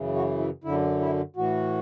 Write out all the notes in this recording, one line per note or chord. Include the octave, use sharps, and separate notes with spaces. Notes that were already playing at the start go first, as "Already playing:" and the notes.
Already playing: F#2 C#3 E3
F#4
E4
F#2 D3 E4
E4
A2 E3 F#4